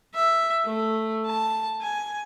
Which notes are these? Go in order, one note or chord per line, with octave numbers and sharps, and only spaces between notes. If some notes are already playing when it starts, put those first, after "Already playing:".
E5
A3
A5
G#5